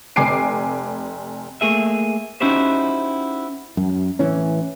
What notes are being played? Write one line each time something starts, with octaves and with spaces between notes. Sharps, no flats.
F1 G#5 D6 C7 D7
A3 A#3 G#4 E5
C#4 D#4 E4 F#4 G4 C5
F#2
A1 E3 C#4